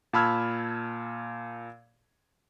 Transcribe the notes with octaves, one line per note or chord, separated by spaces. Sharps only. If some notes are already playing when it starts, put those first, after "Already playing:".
A#2 A5 B5 E6 F6 G#6